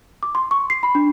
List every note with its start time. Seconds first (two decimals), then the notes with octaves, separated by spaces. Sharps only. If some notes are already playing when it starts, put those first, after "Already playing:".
0.23 D6
0.35 C6
0.51 C#6
0.70 C7
0.83 B5
0.95 D4